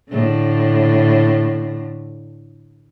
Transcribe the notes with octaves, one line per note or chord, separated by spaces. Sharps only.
A2 D3